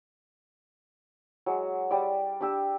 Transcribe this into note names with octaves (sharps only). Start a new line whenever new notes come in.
F#3 G#3
G3 D5
D4 G4 E6